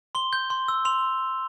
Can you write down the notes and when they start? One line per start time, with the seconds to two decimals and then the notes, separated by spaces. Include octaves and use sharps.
0.15 C6 G7
0.33 G6
0.50 C6
0.68 E6
0.85 C6 F7